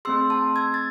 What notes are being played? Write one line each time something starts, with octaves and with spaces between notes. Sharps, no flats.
A3 C4 G#4 C6 E6
A5 C6
E6 G#6
A6